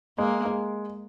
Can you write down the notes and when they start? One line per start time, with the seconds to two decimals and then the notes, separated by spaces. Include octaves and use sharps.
0.18 G#3 A#3
0.45 G#3